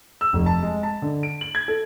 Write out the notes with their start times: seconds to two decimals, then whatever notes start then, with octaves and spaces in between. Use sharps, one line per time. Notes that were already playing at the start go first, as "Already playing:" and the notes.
0.21 E6
0.33 F1
0.46 A5
0.63 G#3
0.83 A5
1.02 D3
1.23 D7
1.41 F#7
1.55 G#6
1.68 A4